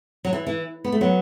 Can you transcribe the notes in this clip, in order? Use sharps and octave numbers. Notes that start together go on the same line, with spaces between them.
F#3
E3
E3
B3
A3
F#3 B3